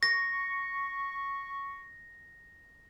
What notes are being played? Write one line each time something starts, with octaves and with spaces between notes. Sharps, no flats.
C#6 A#6